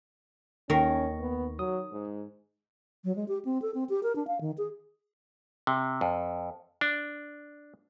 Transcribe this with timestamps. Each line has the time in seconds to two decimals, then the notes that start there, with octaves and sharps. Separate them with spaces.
0.70 D#2 D#3 C#4 A#4 C#6 A#6
1.20 B3
1.59 F#3 D#6
1.92 G#2
3.04 F#3
3.16 G#3
3.28 G4
3.45 C4
3.62 A4
3.74 C4
3.89 G4
4.03 A#4
4.16 D4
4.27 F5
4.41 D#3
4.58 G#4
5.67 C3
6.01 F2
6.81 D4